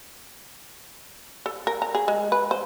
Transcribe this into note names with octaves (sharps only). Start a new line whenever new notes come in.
A4
A#4
A#5
G#4
G#3
B4
C5